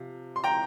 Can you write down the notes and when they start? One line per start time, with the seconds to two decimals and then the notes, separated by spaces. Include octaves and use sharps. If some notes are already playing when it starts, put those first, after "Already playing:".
Already playing: C3 F3
0.36 C6
0.44 G5 A#5